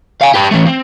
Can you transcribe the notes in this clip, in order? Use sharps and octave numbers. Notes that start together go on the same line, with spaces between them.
F5 G#5
G4 B4
E3 A3
C4